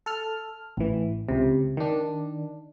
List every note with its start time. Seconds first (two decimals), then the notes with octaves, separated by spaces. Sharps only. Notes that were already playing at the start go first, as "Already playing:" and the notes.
0.06 A4 F6
0.77 A1 E3
1.28 C#2 C3
1.77 D#3 D4